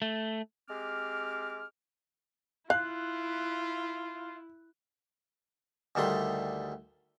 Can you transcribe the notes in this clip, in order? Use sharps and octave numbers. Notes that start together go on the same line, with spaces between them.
A3
G#3 C4 G4 D6 F6
E4 F4 F5 F#6
D2 D#3 G3 A3 C6